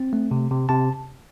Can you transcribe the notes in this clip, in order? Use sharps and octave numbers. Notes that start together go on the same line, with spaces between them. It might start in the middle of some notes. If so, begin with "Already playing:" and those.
Already playing: C4
A3
C3
C3
C3 A5